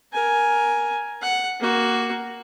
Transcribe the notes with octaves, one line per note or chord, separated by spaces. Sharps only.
A#4 G#5
F#5
A#3 F#4